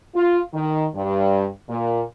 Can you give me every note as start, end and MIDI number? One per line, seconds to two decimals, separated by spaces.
0.15 0.39 65
0.53 0.86 51
0.95 1.47 43
1.69 2.02 46